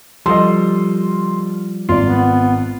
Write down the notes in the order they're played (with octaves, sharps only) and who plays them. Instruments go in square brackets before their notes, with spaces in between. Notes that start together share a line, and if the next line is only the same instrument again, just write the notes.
[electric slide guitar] F3 G3 [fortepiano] A4 D#5 [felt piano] C6
[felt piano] G#1 [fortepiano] F4 D5
[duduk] B3